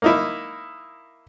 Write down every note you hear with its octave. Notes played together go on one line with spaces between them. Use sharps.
A#3 D#4 E4